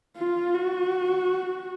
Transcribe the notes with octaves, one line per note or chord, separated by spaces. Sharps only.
F4
F#4